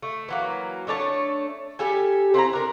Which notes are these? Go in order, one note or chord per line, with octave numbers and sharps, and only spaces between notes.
A3
E3 F#3 A#3
A3 D4 C#5 A5
G3 G4 A4 G#5
C4 E4 G5 A#5
D4 A#4